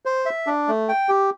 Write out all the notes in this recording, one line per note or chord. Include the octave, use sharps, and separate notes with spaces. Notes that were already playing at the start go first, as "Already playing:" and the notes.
C5
E5
D4
A3
G5
G4